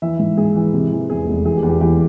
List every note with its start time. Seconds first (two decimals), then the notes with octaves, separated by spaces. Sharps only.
0.02 E3 E5
0.19 G#2
0.37 G#2 G#4
0.56 E3
0.73 C3
0.92 E3
1.10 E2 G#4
1.26 F1
1.45 E3 G#4
1.57 G4
1.63 E2
1.69 G4
1.80 E3 G4